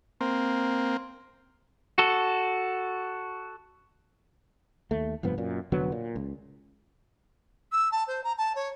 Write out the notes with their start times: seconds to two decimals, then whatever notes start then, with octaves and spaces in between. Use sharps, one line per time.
0.21 A#3 C4
1.98 F#4 A4
4.91 D#2 A3
5.23 F1 G2 F3 B3
5.38 F#2 A#2
5.72 F1 D3 F#3 B3
5.92 A#2
6.16 C#2
7.72 E6
7.92 A5
8.07 C5
8.24 A#5
8.38 A5
8.55 C#5